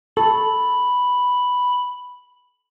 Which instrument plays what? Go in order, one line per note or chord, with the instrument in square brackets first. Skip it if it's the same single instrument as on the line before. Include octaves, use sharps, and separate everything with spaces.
[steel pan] A4 [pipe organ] B5